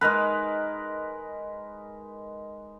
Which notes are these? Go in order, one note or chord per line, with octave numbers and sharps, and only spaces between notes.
G#3 D#4 A#4 B4